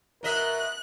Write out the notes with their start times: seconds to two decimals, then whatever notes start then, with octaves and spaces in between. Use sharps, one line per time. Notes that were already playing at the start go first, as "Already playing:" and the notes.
0.23 B2 A#4 D#5 E5 F#6